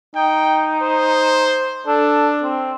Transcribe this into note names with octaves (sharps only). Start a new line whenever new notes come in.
D#4 G5
C5
D4 A4
C4